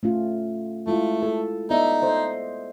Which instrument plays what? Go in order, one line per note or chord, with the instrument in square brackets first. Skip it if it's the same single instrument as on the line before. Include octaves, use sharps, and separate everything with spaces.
[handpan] A3 C#4 F4
[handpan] G#3 E4 F4 [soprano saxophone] A3
[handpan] A4
[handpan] B3 D5 E5 [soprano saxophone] D#4
[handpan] A4 C5 D#5